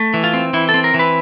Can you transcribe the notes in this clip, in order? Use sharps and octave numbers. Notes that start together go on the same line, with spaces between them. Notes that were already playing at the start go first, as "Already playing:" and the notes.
Already playing: A3
E3
F4
C4
E3 E4
A4
C4
A#4
E3
B4